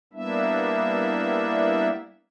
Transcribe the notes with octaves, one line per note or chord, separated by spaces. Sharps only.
G3 A#3 B3 D4 E4 E5